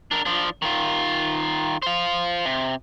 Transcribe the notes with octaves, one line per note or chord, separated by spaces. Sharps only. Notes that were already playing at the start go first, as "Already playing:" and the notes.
D4 A#4
F3 D4
D#3 F4
C5 F5
C3